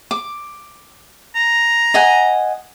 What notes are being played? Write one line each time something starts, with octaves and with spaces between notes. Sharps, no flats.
D6
A#5
D#5 F#5 G#5